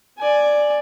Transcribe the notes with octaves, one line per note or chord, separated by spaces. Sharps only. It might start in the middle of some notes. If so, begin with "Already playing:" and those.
D5 G#5